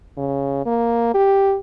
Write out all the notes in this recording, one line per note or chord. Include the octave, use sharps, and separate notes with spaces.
C#3
A#3
G4